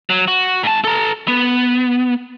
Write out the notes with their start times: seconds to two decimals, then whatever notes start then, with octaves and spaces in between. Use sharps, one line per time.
0.10 F#3
0.28 F#4
0.63 G#2 A5
0.84 A4 A#5
1.28 B3